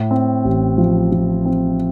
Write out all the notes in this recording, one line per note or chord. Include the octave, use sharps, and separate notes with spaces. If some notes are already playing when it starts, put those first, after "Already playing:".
Already playing: A2
C4
A1
F3
F3
C4